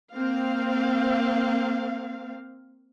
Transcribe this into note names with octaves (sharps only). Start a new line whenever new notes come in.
A#3 C4 F5